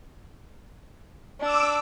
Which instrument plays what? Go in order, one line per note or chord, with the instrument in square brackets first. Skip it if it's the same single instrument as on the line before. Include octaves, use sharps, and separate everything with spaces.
[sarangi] D4 [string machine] D6 E6